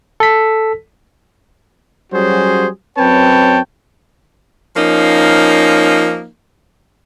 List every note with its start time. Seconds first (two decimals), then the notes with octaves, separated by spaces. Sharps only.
0.20 A4 B6
2.13 F#3 G3 C#4 F#4 G#4 C5
2.97 F#2 C4 B4 C#5 G5 A5
4.76 F3 A#3 C#4 D#4